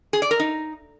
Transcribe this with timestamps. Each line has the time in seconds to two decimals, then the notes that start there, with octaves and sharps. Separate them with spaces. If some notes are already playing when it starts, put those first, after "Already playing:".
0.13 G#4
0.22 D5
0.31 A#4
0.40 D#4